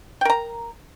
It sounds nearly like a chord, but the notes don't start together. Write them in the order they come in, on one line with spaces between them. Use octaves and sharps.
G5 A#4 A#5